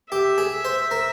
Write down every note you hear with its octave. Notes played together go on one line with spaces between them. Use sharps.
G4 E5
G#4
C5
A#4